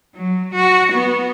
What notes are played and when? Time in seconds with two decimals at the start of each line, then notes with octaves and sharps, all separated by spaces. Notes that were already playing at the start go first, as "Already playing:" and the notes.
0.15 F#3
0.55 F#4
0.93 B3